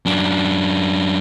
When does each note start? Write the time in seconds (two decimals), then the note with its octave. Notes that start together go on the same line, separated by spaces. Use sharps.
0.06 F#2 D4